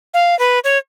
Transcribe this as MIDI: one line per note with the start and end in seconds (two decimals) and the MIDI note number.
0.14 0.37 77
0.39 0.59 71
0.64 0.78 73